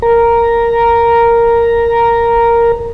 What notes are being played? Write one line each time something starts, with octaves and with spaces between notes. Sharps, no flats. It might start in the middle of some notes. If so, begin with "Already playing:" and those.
A#4 A#5